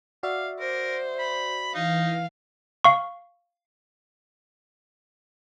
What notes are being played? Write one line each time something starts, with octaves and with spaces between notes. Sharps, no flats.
F#4 D5 E5 F5
A#4 C5
B5
E3 D#4 F5
F5 C#6